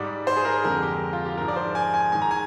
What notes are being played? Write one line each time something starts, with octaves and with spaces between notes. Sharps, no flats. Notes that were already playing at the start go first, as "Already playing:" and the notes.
Already playing: G#2 G3 D5
C5
G#4
A#4
F2 D3 G#3 A#4
G4
F4
G4
G#2 F3 G#3 A#4
D5
C5
G#5
G#5
G#2 D#3 G#3 G#5
A#5
G#5